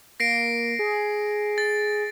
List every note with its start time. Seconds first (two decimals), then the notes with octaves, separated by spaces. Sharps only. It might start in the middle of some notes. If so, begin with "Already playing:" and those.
0.20 A#3 A#6 C7 D7
0.79 G#4
1.58 A6